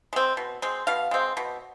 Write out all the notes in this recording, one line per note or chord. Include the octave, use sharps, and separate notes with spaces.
G#3 C4
B2
G#3 C4
B2 F5
G#3 C4
B2